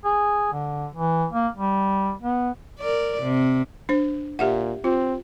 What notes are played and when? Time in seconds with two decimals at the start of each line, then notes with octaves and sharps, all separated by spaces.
0.05 G#4
0.53 D3
0.95 E3
1.33 A#3
1.57 G3
2.22 B3
2.80 A#4 D5
3.22 C3
3.89 D4 C5
4.39 A#2 G4 E5 F#5
4.84 C4 F4